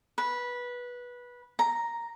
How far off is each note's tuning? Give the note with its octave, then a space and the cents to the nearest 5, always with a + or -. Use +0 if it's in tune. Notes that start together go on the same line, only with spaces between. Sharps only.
B4 -15
A#5 +0